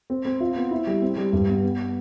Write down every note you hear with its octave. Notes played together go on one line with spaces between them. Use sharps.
C4
C4
F4
B3
E4
G3
C4
G3
G2
B3
B3
B3